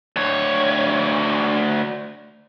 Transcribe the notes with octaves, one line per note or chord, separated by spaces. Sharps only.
D2 C#5